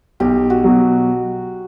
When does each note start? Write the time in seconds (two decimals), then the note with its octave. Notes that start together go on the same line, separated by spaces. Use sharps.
0.20 B1 G4
0.50 F#4
0.64 B2 F#3